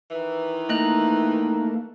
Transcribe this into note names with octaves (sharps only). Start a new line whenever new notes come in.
D#3 E3
A3 A#3 D#4 A#5 F#6